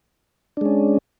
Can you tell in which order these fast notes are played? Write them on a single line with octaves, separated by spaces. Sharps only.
D4 G#3 C#4